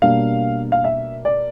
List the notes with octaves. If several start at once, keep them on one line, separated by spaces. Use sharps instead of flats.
B2 G3 A#3 D4 F5
F5
E5
D5